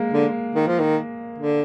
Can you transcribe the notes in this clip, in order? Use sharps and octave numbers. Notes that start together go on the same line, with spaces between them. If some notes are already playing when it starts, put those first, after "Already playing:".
Already playing: G#3 A#3
D3
D#3
F3
D#3
D3